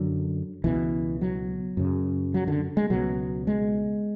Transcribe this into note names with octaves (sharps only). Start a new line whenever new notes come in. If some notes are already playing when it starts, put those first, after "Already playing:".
Already playing: F#2 D3 F#3
C#2 B2 E3
F#3
F#2 C#3
F#3
D3
G#3
C#2 B2 F#3
G#3